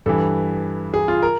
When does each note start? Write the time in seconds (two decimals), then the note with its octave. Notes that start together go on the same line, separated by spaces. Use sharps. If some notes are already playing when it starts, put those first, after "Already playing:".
0.06 G2 E3 A4
0.94 G#4
1.08 F4
1.23 A#4